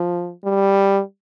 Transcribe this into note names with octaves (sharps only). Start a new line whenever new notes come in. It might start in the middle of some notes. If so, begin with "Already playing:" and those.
Already playing: F3
G3